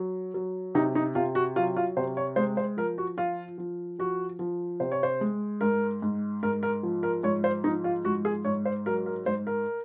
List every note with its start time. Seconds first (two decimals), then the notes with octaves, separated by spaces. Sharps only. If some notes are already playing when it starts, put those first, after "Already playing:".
Already playing: F#3
0.34 F#3
0.75 C3 D#4
0.95 D#4
1.15 C3 F4
1.35 F#4
1.56 F#3 F4
1.76 F4
1.97 C3 C5
2.17 C#5
2.36 G#3 C5
2.57 C5
2.77 F3 A#4
2.98 F#4
3.17 F3 F4
3.58 F3
3.99 F3 F#4
4.39 F3
4.80 C3 C5
4.92 C#5
5.03 C5
5.21 G#3
5.61 G#2 A#4
6.02 G#2
6.43 G#2 A#4
6.63 A#4
6.83 F3
7.03 A#4
7.23 G#2 C#5
7.44 C5
7.64 F3 D#4
7.84 F4
8.05 G#2 F#4
8.25 G#4
8.45 G#2 C#5
8.65 C5
8.86 F#3 A#4
9.06 A#4
9.26 G#2 C5
9.47 A#4